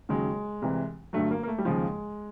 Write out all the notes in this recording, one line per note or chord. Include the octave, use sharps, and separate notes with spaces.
D#2 C#3 F#3 G#3
C2 C3 E3
G2 D3 F#3 A3
A#3
A#3
A3
G3
D#2 C#3 F3 G#3